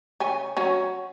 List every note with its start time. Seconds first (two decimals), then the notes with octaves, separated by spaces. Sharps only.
0.20 C#3 C#4 G#5
0.57 F#3 C#4 F#4